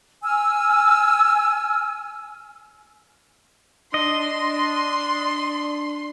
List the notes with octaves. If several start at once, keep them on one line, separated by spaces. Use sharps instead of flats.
G#5 E6 F6
D4 D#5 C6